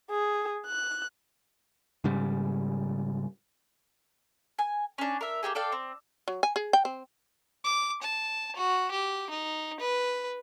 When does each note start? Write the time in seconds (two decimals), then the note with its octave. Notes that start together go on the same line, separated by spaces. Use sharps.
0.10 G#4
0.67 F#6
2.04 G#2 C#3 G3
4.59 G#5
4.98 C#4 D4
5.21 A#4 E5
5.43 A#3 C4 G4 G#4
5.55 A4 D5 F5 G5
5.72 C4
6.28 F#3
6.43 G#5
6.56 G#4
6.73 G5
6.85 C4
7.64 D6
8.02 A5
8.56 F#4
8.91 G4
9.30 D#4
9.80 B4